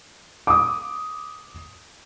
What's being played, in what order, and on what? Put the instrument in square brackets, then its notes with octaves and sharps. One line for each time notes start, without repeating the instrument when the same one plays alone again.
[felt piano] D6 D#6